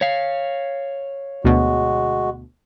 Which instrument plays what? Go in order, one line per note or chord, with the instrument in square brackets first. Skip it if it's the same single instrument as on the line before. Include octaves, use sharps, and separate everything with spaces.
[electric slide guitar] C#5 F5
[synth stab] D2 B2 [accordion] G#3 F#4